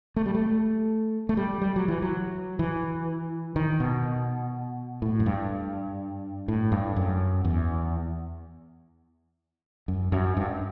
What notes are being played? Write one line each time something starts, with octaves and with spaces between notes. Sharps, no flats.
A3
G3
A3
A3
G3
G3
F#3
E3
F#3
E3
D#3
B2
A2
F#2
G2
A2
G2
F#2
E2
F#2
F#2
G2